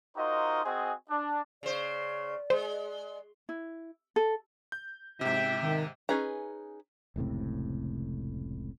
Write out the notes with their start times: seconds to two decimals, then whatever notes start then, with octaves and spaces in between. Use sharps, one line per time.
0.17 D#4 F4 F#4 A#4 C5 D#5
0.65 C4 F#4 G#4 C5 D#5 G#5
1.10 D4
1.63 C#3 C5 D5
2.50 G#3 C5
3.49 E4
4.16 A4
4.72 G6
5.21 G#2 C3 E5 G5
5.61 D#3
6.09 C#4 D#4 G#4 B4 A#5
7.16 F1 C#2 A2 C3